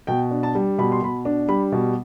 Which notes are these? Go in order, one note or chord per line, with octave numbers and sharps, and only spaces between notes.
B2 G5
D4
A5
G3
B2 B5
C6
B2 B5
D4
G3 B5
B2